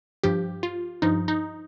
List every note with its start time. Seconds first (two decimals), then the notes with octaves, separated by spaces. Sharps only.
0.24 G2 F3 G4
0.63 F4
1.02 G2 F3 D#4
1.28 D#4